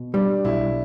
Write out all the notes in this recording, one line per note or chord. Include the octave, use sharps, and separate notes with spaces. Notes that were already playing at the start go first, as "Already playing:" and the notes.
Already playing: B2
G3 D4
B1 E4